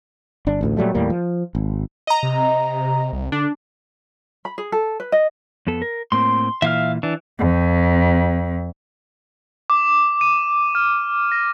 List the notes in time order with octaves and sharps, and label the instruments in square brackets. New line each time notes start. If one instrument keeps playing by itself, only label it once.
[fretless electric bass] G1 D4
A1 D2 A2
A#2 F#3 G3 A3
D#2 A2 G3 A#3
F3
G#1
[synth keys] D#5 A#5
[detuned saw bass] C3
C2
[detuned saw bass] D3 [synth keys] D4
[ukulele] B5
G#4
A4
B4
D#5
[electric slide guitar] F2 B3 A4
A#4
[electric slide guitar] A2 A#3 C4 [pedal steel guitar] C6
[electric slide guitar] A#2 E3 [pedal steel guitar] E5 F5 F6
[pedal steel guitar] E3 [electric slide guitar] D4
[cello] F2
[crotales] D6
D#7
F6
A#6